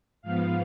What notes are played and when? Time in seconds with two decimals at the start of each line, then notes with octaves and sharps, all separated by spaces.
0.22 G#2 F3 B3 F5